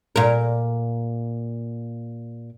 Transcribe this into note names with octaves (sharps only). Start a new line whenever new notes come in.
A#2 A#4